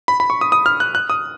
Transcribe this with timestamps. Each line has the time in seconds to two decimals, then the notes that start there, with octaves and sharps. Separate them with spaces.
0.08 B5
0.20 B5
0.30 C#6
0.41 D#6
0.52 D#6
0.66 F6
0.80 F#6
0.95 F#6
1.10 D#6